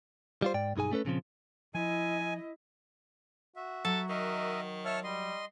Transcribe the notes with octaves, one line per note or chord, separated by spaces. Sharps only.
G3 F4 C5
G#2 D5 G5
B1 G2 D#4 G#4 G#5
A3 C#4 A4 B4
A#2 C#3 F3 C4
F3 E4 D#5 G#5
F#4 E5
F#3 A4
D#3 A#4 D#5 E5
C#5 E5 A5 F6
G3 D#5 C6